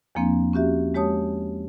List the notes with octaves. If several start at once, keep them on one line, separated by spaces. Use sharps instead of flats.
E2 F3 A#3 C4 D4
C#4 F#4 G4 E5
G#3 G4 C#5 A5 D#6